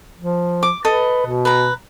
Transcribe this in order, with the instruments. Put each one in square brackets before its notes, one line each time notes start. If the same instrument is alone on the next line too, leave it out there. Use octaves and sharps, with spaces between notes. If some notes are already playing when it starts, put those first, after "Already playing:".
[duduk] F3
[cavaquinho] D6
[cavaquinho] A4 D#5 [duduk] B4
[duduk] B2
[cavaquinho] B4 A#5